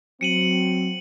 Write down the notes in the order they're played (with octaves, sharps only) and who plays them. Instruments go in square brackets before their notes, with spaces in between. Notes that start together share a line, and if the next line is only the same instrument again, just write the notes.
[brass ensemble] F#3 C4 [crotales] C#7 D#7 F#7